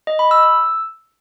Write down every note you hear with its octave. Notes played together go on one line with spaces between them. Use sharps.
D#5
B5
E6
E6